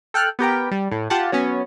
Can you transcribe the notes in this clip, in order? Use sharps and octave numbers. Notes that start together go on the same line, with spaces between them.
A4 G5 F6 F#6
B3 G4 A#4 G5
G3
A2
F4 G4 F#5 A5
F#3 B3 C#4